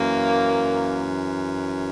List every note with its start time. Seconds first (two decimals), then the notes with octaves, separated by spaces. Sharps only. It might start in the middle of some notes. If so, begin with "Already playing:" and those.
Already playing: F#2 E3 A#3